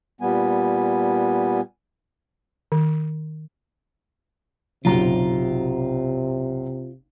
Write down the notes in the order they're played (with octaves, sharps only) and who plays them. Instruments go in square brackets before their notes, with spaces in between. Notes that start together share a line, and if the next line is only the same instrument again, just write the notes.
[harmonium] A#2 G3 B3 G#5
[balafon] D#3
[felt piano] F#1 B1 A#5 [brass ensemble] C3 [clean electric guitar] F4 G4